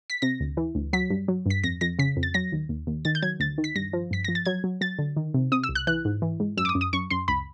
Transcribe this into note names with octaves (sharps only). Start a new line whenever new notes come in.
B6
C3 A#6
D2
E3
D2
F#3 B6
G2
F#3
G2 B6
F2 A#6
F2 A#6
C#3 B6
F2
A6
F#3 A#6
D#2
D#2
D#2
D#3 A6
G6
F#3 G#6
D2 A6
D#3
B6
G2 A#6
F3
G2 B6
F3 A#6
A6
F#3 G#6
F#3
F#3 A6
D3
D#3
C3
C3 D#6
E6
C2
F#6
E3 F#6
G#2
E3
G#2
F#2 E6
D6
D#6
F#2
D#6
F#2 C#6
F#2 C6
C#2 B5